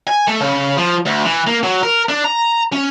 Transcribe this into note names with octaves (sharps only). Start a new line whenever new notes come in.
G#5
A3
C#3
F3
D2
E3
A#3
F#3
A#4
D4
A#5
C#4